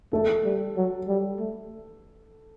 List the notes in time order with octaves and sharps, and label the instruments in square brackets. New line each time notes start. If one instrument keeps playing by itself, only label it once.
[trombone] A3 [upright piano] A4
[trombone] G3
F#3
G3
A3